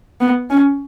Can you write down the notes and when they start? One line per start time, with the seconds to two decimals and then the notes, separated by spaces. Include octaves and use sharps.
0.21 B3
0.50 C#4